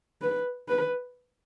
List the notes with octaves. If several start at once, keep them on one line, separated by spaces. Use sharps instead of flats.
B4
B4